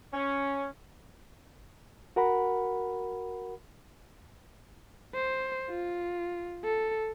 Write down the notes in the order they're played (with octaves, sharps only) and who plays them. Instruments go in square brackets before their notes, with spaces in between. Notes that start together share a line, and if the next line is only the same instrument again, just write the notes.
[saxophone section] C#4
[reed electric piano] F#4 A#4 F#5 B5
[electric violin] C5
F4
A4